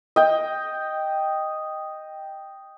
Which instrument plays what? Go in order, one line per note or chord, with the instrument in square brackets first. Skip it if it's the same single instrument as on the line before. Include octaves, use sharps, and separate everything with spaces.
[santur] D#5 G5